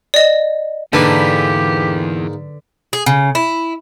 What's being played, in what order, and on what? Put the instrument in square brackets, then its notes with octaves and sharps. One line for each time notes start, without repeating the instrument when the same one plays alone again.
[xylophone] D5 D#5
[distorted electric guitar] E2 [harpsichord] G#2 A#3 [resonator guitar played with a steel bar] D3 B4 [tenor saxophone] G4
[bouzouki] G#4
C#3
E4